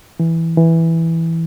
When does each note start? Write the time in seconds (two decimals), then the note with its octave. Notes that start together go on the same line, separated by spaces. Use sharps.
0.20 E3
0.58 E3